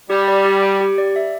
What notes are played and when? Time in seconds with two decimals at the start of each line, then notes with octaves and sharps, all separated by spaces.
0.10 G3 G4
0.28 D5
0.45 G4
0.63 G5
0.81 G4
0.98 D5
1.16 E5